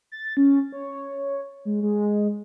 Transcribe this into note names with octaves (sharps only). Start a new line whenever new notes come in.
A6
C#4
C#5
G#3
G#3